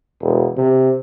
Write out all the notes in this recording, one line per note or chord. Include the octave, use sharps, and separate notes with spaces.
E1
C3